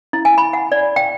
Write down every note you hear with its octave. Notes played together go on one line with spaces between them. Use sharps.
E4
G#5
B5
F#5
D5
G5